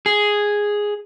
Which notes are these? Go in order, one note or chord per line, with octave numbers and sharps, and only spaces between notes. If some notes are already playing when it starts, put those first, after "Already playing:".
G#4